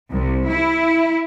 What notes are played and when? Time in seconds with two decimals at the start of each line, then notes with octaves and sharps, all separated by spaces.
0.12 C2
0.47 E4